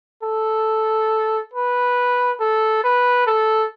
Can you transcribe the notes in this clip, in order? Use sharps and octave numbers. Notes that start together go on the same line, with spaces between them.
A4
B4
A4
B4
A4